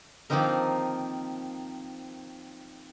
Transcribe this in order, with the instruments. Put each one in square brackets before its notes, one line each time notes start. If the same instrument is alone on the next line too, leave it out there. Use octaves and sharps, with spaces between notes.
[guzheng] D#3 F3 A#3 C4 D#4 A#4